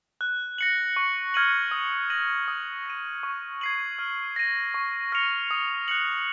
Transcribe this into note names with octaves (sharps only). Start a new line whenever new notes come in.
F#6
A#6 C#7 F#7
C#6
F6 G#6 D#7 F#7
D#6
A#6 D#7 F#7
D#6
A#6 D#7
C#6
G#6 C7 D#7 F#7
F6
A#6 D#7
C#6
F6 A#6 C#7 F7
D#6
F#6 C#7 F#7